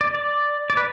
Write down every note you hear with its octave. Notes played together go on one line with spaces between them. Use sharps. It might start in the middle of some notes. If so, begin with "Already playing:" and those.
D5
D5
D5
B4